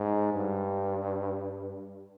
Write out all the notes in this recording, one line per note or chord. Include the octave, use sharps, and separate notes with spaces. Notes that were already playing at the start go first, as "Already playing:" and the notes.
Already playing: G#2
G2